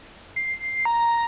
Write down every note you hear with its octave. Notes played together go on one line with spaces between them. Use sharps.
C7
A#5